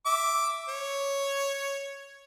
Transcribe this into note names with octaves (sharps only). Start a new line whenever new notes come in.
E5 D6
C#5